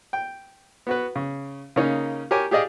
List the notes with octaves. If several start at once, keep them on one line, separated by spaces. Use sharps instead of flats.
G5
B3 F#4 B4
C#3
C#3 A#3 C#4 D#4
G4 A#4 C#5 G#5 D6
G4 G#4 D5 D#5 F5